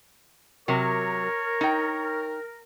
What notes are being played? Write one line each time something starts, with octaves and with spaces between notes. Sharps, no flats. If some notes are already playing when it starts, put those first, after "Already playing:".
C3 F#3 A#4 C#5
D#4 G5